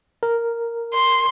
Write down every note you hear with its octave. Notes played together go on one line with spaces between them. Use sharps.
A#4
C6